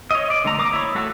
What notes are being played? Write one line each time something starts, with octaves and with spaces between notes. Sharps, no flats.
C#5 D#5
D5
D3 A3 A#5
A#3 D6 D#6
E4 C#5
A3 F#4 A4